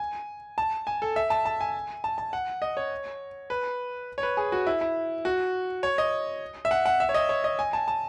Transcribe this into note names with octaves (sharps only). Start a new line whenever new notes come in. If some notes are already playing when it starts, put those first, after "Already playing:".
Already playing: G#5
A5
G#5
A4
E5
A5
A5
G#5
A5
A5
F#5
D#5
C#5
B4
C#5
B4
G#4
F#4
E4
E4
F#4
C#5
D#5
E5
F#5
F#5
E5
C#5
D#5
C#5
D#5
G#5
A5
A5